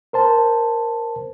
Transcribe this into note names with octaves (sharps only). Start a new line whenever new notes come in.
A#4 C5 A5